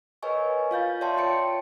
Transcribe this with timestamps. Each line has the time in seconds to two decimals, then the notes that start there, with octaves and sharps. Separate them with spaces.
0.22 A#4 B4 C#5 D#5 G#5 C#6
0.71 F4 F5 G6 A6
1.01 C#5 D5 E5 G5 A5 C6
1.17 F4 C#5 G5 A5 C#7 D7